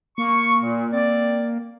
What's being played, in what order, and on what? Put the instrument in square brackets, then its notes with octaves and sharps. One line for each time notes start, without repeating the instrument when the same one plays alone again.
[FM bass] A#3 [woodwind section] C#6
[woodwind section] A#2
C4 D5